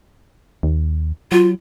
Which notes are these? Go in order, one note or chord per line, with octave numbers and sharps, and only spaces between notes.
D#2
F#3 F4